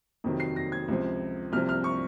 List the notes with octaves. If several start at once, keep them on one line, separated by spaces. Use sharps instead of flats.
F2 C3 D#3 F#3
C7
A#6
G#6
C#2 C3 F3
C2 C3 F3 F6
F6
C#6